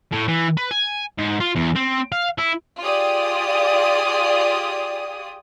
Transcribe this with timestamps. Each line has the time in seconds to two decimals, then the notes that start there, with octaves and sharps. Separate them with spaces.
0.12 A2
0.28 E3
0.57 B4
0.71 G#5
1.18 G#2
1.40 F4
1.55 E2
1.76 C4
2.12 F5
2.38 E4
2.79 F4 G4 G#4 D5 D#6